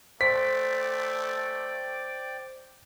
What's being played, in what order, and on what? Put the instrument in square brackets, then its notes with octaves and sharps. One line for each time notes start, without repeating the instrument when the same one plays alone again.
[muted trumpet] A3 [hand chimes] C5 [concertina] D5 G5 D6 [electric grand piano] B6